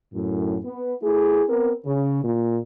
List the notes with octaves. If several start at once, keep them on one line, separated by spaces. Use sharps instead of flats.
F#2 A2
B3
A3 E4 G#4
B3 C4 A#4
C#3
A#2